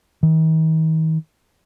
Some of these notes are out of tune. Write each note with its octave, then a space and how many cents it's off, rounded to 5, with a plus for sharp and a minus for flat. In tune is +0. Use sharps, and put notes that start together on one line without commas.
D#3 +45